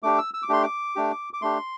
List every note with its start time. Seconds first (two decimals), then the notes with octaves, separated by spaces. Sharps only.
0.03 A3 D4 G4 D6
0.18 E6
0.34 E6
0.42 D6
0.49 A3 D4 G4 C6
0.63 D6
0.95 A3 D4 G4
1.33 D6
1.42 A3 D4 G4 C6